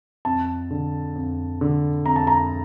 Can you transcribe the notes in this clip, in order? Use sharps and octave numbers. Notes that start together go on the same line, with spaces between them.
F2 A5
D3
F2
D3
F2 A#5
A5
A#5